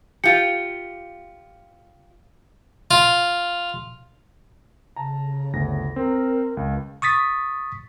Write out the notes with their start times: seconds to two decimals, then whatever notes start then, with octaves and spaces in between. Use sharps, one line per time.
0.24 F4 G4 C#7
2.91 F4
4.96 C#3 A5 A#5
5.53 G1 D2 A#6
5.96 C4 A#4
6.57 C#2
7.02 C#6 D#6 A6 B6